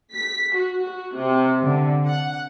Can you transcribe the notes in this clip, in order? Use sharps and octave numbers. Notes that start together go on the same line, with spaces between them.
B6
F#4
F#4
C3
D3
F#5